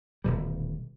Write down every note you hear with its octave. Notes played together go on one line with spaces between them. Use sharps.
D#1 D2 B2 G3